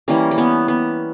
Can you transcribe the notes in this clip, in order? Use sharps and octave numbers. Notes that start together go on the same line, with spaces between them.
E3 G3 A#3 C#4
C#4
B3
B3